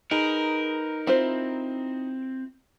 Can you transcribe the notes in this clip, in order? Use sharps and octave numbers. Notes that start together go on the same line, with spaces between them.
D#4 G#4 A#4 B4
C4 E4 F4 C5